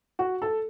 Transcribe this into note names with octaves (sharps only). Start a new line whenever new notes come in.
F#4
A4